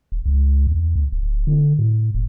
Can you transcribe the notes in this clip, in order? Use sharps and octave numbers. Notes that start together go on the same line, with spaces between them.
D#1
C#2
E2
D2
D1
D3
A2
E1